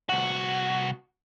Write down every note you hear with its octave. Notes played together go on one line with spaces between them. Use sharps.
C2 F#4